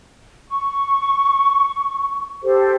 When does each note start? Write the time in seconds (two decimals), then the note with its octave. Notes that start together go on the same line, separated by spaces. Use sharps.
0.49 C#6
2.43 G4 A4 C5